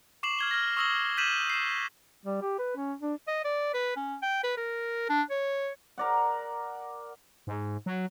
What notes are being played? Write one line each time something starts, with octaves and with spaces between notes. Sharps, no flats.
C#6 D6 C7 E7 F#7
F6 G#6 G7
F6 A#6
C#6 D#6 E6 A#6 F#7 G7
F6 G6 B6 D#7 E7 F#7
C7 E7
G3
G4
B4
C#4
D4
D#5
D5
B4
C#4
G5
B4
A#4
D4
C#5
A#4 D5 F#5
G#2
F#3